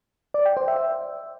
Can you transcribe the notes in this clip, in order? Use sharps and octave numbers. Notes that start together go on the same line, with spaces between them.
D5
G5
C5
E5